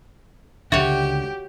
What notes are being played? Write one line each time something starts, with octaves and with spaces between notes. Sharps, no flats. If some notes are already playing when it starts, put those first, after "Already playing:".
C#2 D3 F#4 G4 C#5 E5